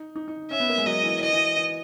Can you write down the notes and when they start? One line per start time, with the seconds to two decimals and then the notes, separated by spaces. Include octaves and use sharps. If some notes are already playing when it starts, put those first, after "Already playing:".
Already playing: D#4
0.16 D#4
0.28 D#4
0.51 C#4 E5
0.60 B3
0.69 A#3
0.78 G#3
0.86 F#3 D#5
1.04 E3
1.21 E3 D#5
1.33 E3
1.57 E3